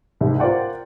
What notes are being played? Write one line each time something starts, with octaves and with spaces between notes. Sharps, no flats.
C2 G#2
F4 A#4 C5 D5 F#5 G5